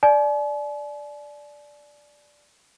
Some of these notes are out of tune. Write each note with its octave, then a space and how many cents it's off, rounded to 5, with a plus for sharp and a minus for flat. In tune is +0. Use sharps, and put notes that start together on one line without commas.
D5 +0 G#5 +45